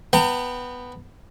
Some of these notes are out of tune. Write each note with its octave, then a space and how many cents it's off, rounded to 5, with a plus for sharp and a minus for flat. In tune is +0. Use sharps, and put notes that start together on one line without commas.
B3 +0 G5 +0 A#5 -40